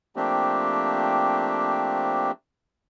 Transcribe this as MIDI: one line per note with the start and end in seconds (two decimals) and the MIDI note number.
0.16 2.31 53
0.16 2.31 57
0.16 2.31 58
0.16 2.31 60
0.16 2.31 62
0.16 2.31 67